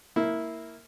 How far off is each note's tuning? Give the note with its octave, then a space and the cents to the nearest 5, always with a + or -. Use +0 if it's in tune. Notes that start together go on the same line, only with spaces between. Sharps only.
A#3 -10 E4 -10